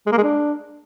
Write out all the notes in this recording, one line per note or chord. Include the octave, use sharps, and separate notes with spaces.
G#3
A#3
G#3
D4